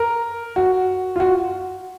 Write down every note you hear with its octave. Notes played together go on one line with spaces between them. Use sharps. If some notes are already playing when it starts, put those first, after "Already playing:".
Already playing: A#4
F#4
F4
F#4